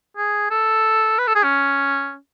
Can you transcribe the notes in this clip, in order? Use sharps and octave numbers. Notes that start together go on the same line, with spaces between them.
G#4
A4
B4
A4
G#4
C#4